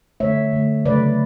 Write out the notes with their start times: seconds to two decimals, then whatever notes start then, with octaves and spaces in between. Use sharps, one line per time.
0.20 D3 A3 C#5 E5
0.53 D3 A3
0.85 C#3 F#3 A3 B4 D5